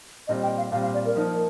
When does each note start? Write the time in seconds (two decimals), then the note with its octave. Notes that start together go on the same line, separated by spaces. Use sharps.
0.28 A#2 G3 C4 D#5
0.43 G5
0.58 F5
0.72 A#2 G3 C4 F5
0.83 F5
0.94 D5
1.05 A#4
1.16 F3 A#3 D#4